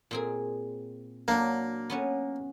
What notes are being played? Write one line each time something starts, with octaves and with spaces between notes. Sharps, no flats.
A#2 C4 G#4
F#3 A#3 D4
B3 C#4 F#4